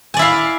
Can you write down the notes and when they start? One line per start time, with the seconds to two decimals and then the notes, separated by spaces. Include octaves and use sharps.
0.14 G#5
0.17 D5
0.19 E4
0.22 F5